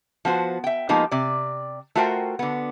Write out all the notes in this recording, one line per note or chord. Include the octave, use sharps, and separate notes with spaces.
F3 B3 F#4 C5
E5 G5
F3 G#3 A#3 B3 D#4 G4
C3 D5
A3 F4 F#4 A#4 C5 G5
D3 B3